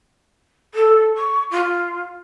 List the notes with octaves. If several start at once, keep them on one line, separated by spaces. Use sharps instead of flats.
A4
C#6
F4